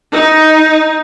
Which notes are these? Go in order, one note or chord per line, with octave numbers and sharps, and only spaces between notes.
D#4